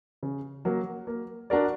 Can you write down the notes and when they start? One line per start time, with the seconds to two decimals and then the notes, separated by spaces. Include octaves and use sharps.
0.23 C#3
0.65 F#3 A#3
1.07 A#3
1.50 D4 F#4 A#4 D5